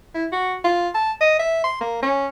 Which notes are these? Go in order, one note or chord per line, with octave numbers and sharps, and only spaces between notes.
E4
F#4
F4
A5
D#5
E5
C6
A#3
C#4